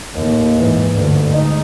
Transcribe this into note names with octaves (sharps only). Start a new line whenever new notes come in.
D#2 A2
G#2 E3
D2 G2
G#3 D#4